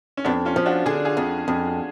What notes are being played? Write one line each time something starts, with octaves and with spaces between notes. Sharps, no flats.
C#4
F2 B3 D4
C#4 F4
F3
D4 F#4
D3 G#4
F4 G#4
F2
F2